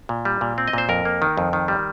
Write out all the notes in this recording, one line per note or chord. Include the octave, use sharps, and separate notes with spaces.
A#2
G3
A#2
C4
D#5
A#2 C5
F2 A#4
A#3
D#3
F2
D#3
G3